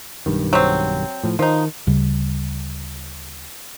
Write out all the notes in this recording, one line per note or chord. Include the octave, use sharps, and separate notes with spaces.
B1 G2 D#3
F#3 C4
A2 F3
D#3 F3 D#4
D2 C#3 G3